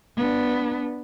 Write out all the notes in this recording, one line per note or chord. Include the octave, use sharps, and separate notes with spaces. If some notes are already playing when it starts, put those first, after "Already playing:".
B3 D4